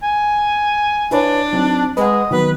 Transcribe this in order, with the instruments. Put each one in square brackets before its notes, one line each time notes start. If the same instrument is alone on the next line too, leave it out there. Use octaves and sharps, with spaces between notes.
[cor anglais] G#5
[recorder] D4 [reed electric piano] E4 B4 C#5
[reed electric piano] F#3 C4 D#4
[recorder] G#3 [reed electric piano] B4 F#5 [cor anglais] D#5
[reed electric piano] D#3 F#3 B3 [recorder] B4